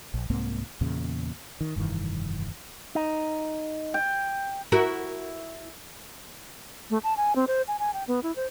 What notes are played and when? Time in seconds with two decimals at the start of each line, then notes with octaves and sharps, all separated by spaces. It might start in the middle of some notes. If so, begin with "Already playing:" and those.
0.14 A#1
0.30 C2 G#2 A#3 C4
0.81 E2 A#2 C#3
1.61 D#3
1.76 F1 G2 D#3 E3
2.95 D#4
3.94 G5
4.72 E4 F#4 A#4
6.90 A3
7.04 A5
7.17 G#5
7.36 C4
7.48 C5
7.68 G#5
7.79 G#5
7.94 G5
8.08 B3
8.23 E4
8.36 C5